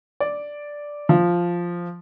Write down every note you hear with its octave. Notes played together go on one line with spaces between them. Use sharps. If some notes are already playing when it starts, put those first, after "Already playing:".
D5
F3